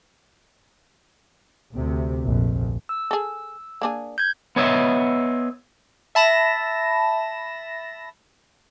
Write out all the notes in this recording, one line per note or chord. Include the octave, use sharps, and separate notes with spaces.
D2 C3
A#1 F2
E6
G#4 A4
A#3 D4 G#4
G6 G#6
B3 C#5 D#5 E5
E5 A5 B5 A#6 E7